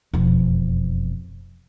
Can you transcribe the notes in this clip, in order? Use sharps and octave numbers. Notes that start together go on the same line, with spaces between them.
E1 F2